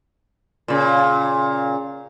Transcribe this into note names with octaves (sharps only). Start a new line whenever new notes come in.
A#2 C#3